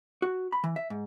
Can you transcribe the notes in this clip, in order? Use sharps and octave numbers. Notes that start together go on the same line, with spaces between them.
F#4
B5
E3
E5
G#2